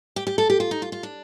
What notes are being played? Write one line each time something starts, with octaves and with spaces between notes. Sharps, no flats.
G4
G4
A4
G4
F4
D#4
F4
F4
D4